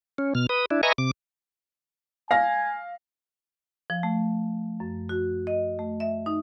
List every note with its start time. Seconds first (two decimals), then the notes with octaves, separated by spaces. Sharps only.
0.18 C#4
0.35 B2 F6
0.49 B4 D#6
0.71 D4 E4
0.83 B4 D#5 E5 G#5 A#5 C#6
0.98 C3 D6
2.31 F5 G#5 A#6
3.90 F3
4.03 A3
4.80 F#2
5.09 F#4
5.47 D#5
5.79 A3
6.00 E5
6.26 D#4